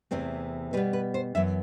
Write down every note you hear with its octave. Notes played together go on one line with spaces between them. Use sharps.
E2 C3 E3 A3 C4
B2 G3 B3 B4
B4
C5
F#2 E3 B3 E5